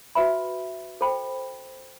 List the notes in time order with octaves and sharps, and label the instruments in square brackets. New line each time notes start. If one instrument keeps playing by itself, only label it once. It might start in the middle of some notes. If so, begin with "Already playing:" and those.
[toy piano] F#4 B4 E5 B5
A4 C5 G5 B5